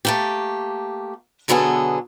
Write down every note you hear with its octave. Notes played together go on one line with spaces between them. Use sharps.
A3 A#3 G4
B2 D3 F#3 B3 G#4 A4